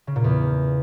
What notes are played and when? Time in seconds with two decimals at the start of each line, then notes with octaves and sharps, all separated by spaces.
0.07 C#3
0.16 A#2
0.24 E2